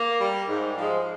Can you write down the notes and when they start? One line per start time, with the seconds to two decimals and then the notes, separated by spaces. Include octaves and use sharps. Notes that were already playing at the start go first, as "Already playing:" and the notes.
Already playing: A#3
0.20 G3
0.49 G#2
0.77 F3 G#3